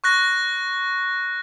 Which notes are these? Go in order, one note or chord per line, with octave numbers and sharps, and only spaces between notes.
C#6 F#6 A#6